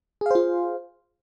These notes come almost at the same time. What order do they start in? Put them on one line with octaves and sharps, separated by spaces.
G#4 F5 C5 F4